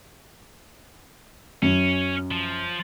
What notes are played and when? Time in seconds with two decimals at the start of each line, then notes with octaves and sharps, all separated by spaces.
1.62 F#2 C#4
2.31 F3